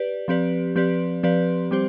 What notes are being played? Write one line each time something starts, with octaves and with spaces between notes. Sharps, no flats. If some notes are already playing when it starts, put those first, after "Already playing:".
Already playing: G4 B4 D5
F3 C4 G4 B4 D5
F3 C4 G4 B4 D5
F3 C4 G4 B4 D5
G3 C4 G4 C5